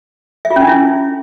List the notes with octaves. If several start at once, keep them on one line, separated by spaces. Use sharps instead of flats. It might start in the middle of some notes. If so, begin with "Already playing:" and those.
E5
F4
C#4
D4
E4